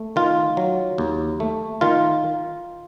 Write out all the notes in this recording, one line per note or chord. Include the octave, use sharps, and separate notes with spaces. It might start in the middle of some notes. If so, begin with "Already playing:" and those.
Already playing: A3
D#3 F4
F#3
D#2
A3
D#3 F4